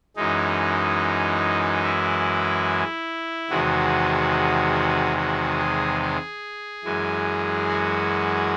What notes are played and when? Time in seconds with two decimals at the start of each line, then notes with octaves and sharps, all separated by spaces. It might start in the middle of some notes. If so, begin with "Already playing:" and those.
0.16 F#2 E3 G#3 D#4
1.83 E4
3.50 E2 C3 D#3 G#3 F#4
5.17 F#4
5.59 G#4
6.01 G#4
6.84 F#2 E3 G#3
7.68 F#4